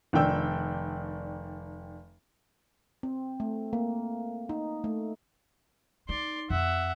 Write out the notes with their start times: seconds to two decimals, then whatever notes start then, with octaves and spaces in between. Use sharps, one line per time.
0.13 F1 D#3 D4 G5 E6
3.03 C4
3.40 A3
3.73 A#3
4.49 D#4
4.84 A3
6.09 D#4 D5 C6
6.50 F2 E5 F#5